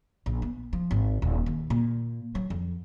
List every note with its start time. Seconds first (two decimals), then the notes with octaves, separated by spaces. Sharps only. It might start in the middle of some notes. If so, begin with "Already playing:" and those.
0.26 A#1
0.42 B3
0.73 F3
0.91 G#1
1.22 D#1
1.46 D#2
1.70 A#2
2.35 F#3
2.50 F2